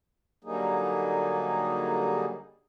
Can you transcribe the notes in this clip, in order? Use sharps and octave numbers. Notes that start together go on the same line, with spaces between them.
D3 F#3 G3 A#3 D#4 G#4